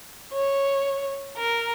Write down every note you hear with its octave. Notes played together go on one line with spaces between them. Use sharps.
C#5
A#4